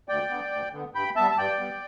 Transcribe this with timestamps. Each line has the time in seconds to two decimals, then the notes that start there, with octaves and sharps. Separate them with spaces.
0.08 D2 D5 G5
0.30 D3 B3
0.52 D2
0.73 D3 B3
0.94 G2 G5 B5
1.16 G3 B3 E5 A5
1.31 A5
1.38 G2 D5 G5
1.59 G3 B3